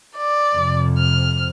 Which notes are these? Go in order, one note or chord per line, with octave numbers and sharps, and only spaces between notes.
D5
F2 C3
F6